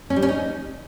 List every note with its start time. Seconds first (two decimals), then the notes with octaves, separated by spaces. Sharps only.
0.10 C#4
0.16 G3
0.22 C#4
0.29 D#4